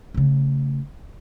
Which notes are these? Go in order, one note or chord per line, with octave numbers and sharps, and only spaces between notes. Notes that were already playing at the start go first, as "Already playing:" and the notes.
C#3 A3